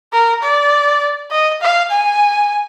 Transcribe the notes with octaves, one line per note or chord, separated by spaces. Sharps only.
A#4
D5
D#5
F5
G#5